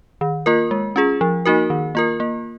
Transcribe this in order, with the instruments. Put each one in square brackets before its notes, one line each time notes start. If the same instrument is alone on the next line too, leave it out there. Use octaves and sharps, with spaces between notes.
[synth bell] D#3
A#3 F4 A#4
G#3
C#4 F4 G#4
F3
A#3 D#4 F#4 A#4
D#3
A#3 F4 A#4
A#3